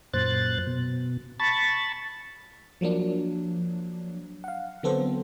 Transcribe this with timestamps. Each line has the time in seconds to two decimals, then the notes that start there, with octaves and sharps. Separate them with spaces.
0.14 F#2 A#2 C5 F#6 A6
0.67 B2
1.40 A5 B5 C#6 A6
2.81 F3 F#3 A#3 D4
4.44 F5 F#5
4.83 D3 F#3 B3 C4 A4 C5